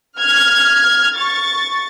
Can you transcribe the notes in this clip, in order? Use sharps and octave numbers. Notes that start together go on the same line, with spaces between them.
F6 G#6
C#6 A6